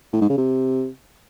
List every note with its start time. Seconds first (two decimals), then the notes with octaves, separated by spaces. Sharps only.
0.13 A2
0.21 G#2
0.29 C#3
0.38 C3